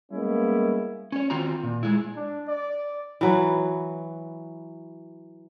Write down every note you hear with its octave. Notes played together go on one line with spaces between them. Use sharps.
G3 G#3 A#3 B3 C#4 E4
C#4 C#5
D#3 C4 F4 F#4 A#5
A#2
G#3 E4
D4
D5
E3 F#3 B4